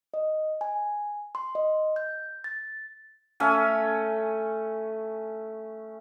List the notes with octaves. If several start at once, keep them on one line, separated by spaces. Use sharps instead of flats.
D#5
G#5
C6
D#5
G6
A6
A3 C#4 G#5